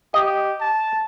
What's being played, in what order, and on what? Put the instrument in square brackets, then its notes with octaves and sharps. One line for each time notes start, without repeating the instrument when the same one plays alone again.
[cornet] G4 [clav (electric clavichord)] D#5
[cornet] A5